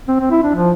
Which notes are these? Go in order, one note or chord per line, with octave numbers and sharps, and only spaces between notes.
C4
C4
E4
D4
F3